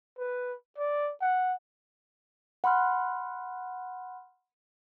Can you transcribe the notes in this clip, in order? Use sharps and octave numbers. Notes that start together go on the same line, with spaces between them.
B4
D5
F#5
F#5 B5 C6 F6 F#6